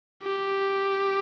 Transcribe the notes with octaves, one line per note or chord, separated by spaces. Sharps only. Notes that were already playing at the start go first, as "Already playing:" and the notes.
G4